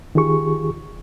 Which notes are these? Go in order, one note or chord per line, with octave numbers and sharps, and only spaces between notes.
D#3 F4 G4 G#4 C#6